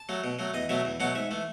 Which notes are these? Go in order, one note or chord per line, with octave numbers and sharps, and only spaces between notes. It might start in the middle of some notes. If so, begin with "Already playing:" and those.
Already playing: A5
F#3 A3
B2
F#3 A3
E2 D#5
B2 F#3 A3 E5
E2
B2 F#3 A3 F#5
G#2 E5
E3 A3